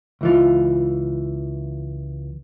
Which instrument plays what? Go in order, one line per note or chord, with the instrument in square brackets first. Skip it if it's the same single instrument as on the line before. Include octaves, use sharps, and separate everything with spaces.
[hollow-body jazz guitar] C#2 E3 F4